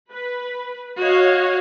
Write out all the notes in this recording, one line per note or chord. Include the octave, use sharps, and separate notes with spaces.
B4
F#4 C#5 D#5 F5